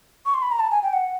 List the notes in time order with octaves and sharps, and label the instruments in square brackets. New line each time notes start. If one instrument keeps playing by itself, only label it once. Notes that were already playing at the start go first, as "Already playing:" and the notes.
[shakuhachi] C#6
C6
B5
A#5
A5
G#5
G5
F#5